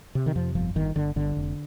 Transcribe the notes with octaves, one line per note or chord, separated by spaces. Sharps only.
C3
D#3
F2 F3
G1 F3
G1 D#3
G1 D3
G1 D3
F1